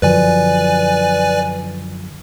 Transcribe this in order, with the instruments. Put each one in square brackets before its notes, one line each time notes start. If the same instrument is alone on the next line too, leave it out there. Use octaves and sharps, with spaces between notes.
[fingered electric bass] F#2 D3 F3 [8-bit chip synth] B4 D5 G#5